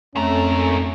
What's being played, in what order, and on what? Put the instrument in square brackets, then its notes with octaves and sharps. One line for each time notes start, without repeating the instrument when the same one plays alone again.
[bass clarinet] F2 [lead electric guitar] G#2 A#4 [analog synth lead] A3 [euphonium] C#4